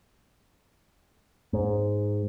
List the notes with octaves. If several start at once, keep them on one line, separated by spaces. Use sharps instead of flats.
G#2